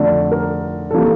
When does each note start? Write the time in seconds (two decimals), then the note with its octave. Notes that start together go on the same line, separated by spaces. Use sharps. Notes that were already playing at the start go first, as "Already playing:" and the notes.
Already playing: F2 D3 A3 D5
0.31 A#4
0.91 E3 G3 A#3 A4